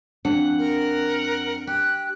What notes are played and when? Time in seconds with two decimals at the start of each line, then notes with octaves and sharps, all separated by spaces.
0.25 F2 D4 F#5
0.58 A#4
1.67 G4 F#6